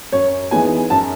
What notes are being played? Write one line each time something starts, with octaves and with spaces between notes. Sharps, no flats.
F#2 C#5
E3 G#3 B3 D#4 G#5
F#2 A5